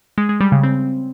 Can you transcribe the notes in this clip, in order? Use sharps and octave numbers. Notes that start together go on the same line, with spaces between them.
G#3
G#3
G3
C#3
C4